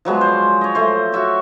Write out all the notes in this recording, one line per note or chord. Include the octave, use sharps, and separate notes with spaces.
F3 F#3 G#3 B3
C5 D5
C#5 D#5
A3 C5
F#4 C#5 E5 F#5